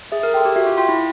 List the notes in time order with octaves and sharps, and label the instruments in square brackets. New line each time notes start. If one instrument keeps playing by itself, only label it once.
[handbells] G#4 [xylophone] E5
[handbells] A#4
[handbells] A4 [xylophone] G5 C6
[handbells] G4
[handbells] F#4 [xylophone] E5
[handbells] F4
[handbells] F4 [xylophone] G5 C6
[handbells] E4